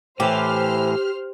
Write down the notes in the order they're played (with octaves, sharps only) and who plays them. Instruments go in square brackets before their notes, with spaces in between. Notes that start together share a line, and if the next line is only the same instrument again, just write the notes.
[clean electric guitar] A2 E3 [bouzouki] G4 [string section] C5 F6